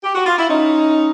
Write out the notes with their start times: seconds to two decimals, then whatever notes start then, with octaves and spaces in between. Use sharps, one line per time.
0.03 G4
0.14 F#4
0.26 F4
0.37 E4
0.48 C#4 D#4